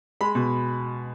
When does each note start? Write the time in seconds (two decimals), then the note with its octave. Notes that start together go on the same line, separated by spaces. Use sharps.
0.21 G#3 B5
0.35 B2